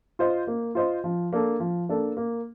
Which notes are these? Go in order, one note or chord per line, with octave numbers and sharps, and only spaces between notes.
F4 C5 D#5
A#3
F4 C5 D#5
F3
A#3 D4 A4
F3
A#3 D4 A4
A#3